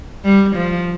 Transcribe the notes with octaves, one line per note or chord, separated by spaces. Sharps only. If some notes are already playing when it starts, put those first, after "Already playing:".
G3
F3